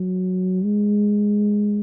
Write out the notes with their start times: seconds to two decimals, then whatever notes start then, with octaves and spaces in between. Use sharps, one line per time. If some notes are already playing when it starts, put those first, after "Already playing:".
Already playing: F#3
0.64 G#3